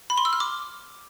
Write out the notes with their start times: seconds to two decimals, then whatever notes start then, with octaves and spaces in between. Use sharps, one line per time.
0.10 B5
0.18 C6
0.25 E6
0.33 F6
0.40 D6